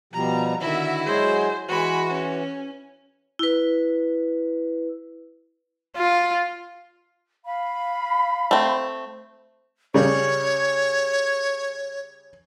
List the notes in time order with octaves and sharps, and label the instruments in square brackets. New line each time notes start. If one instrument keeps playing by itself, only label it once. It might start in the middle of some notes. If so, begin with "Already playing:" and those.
[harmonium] B2 F3 G3 [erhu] A#5
[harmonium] D3 D#3 [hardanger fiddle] E4 F#4 [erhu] E5
[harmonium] F#3 G#3 G#4 [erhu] C5
[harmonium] E3 [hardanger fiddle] G#3 B5 [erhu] F#4
[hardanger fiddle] C#4
[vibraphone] E4 B4
[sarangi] F4
[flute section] F5 B5
[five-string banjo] A3 C4
[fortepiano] C#3 G3 [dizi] C#5